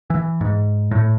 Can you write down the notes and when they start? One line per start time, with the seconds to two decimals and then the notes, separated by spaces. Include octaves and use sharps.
0.10 E3
0.41 G#2
0.91 A2